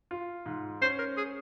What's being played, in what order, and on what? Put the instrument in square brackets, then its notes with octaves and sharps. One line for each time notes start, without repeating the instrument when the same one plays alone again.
[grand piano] F4
G#2
[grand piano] C#4 [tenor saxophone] C5
[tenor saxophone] A#4
G#4